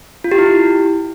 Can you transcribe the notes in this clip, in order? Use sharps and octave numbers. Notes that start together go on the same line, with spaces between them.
F4
G4
E4